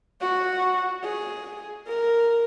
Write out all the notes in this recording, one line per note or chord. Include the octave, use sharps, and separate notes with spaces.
F#4
G#4
A#4